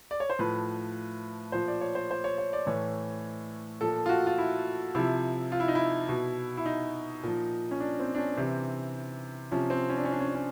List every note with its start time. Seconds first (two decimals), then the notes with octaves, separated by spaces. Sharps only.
0.11 D5
0.20 C#5
0.30 C5
0.39 A2 F3 B4
1.52 A#2 F3 C5
1.68 D5
1.81 C#5
1.95 C5
2.11 C5
2.24 C#5
2.38 C#5
2.53 D5
2.67 A2 E3 C#5
3.81 A#2 F3 A4
4.06 F4
4.09 F#4
4.27 F4
4.38 E4
4.95 C3 F3 E4
5.52 F4
5.60 E4
5.68 D#4
5.75 E4
6.09 B2
6.57 E4
6.66 D#4
7.23 A#2 F3
7.71 C#4
7.80 D4
8.00 C4
8.15 D4
8.18 C#4
8.37 C3 E3 C4
9.51 C3 F3 C#4
9.70 C4
9.89 C#4
9.97 D4
10.04 C#4
10.12 D4
10.20 C#4
10.27 D4
10.34 C#4